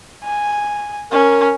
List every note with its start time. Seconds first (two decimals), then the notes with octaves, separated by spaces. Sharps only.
0.24 G#5
1.12 C#4 A#4